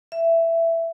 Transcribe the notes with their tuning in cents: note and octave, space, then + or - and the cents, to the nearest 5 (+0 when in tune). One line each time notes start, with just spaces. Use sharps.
E5 +10